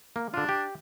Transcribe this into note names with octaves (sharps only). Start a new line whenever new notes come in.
A#3
D3 D4 F4
G4